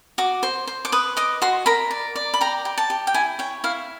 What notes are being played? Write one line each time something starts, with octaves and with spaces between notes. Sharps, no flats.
F#4 D6
C5
C5
D6
B4 D#6
D#5 D6
F#4 C6
A#4 B5
D5
D5
B5
G4 A#5
G4
A5
G4
G5
E4 G#5
C#5 G5
E4 F5